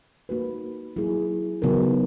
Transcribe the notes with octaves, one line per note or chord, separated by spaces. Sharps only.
A#3 D#4 F#4 B4
F#3 A#3 E4 G#4
C#3 F#3 B3 D#4 A#4